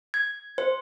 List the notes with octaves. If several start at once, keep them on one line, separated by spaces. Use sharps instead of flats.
G#6
C5